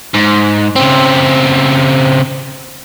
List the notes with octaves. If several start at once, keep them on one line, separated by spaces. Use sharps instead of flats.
G#2
C#3 C4